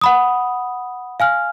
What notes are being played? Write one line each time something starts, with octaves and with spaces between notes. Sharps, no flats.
F#5 B5 D#6
F5 G#5 F6